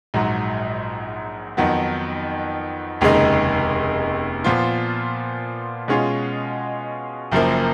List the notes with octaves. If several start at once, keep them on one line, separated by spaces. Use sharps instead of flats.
A#1 G#2 F#3
F2 D#3 F#3 B3
F1 D#2 C#3 G#3 D#4
A#2 F3 B3 F4
B2 G#3 C#4 F4 G#4
F#1 F#2 F3 A#3